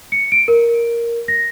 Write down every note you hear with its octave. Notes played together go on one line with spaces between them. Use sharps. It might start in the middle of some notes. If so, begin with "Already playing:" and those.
C#7
D7
A#4
A#6